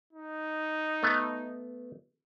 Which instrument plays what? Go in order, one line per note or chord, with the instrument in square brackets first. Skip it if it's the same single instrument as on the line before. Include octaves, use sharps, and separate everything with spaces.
[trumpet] D#4
[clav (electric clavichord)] A3 B3